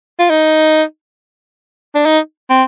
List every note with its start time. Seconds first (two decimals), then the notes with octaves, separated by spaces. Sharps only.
0.19 F4
0.30 D#4
1.95 D4
2.06 D#4
2.50 C4